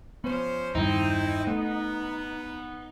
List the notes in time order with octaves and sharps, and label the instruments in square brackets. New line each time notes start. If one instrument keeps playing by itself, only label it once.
[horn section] F3 C#4 C5 [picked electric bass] B3
[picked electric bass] E2 G2 D#3 [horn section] C4 E4 [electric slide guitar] D#4
[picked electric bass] A3 [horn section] B3